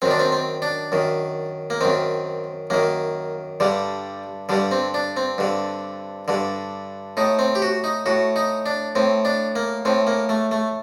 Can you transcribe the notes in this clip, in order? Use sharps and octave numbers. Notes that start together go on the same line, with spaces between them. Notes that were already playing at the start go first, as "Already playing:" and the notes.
F#2 D#3 C4
D4
C4
C4
D4
F#2 D#3
A#3
F#2 D#3 C4
F#2 D#3 A#3
G2 D3 G3
G2 D3 G3
C4
D4
C4
G2 D3
G2 D3
A2 D#4
C4
G4
F#4
D#4
A2 F#4
D#4
D4
A2 C4
D4
A#3
A2 C4
A#3
A3
A3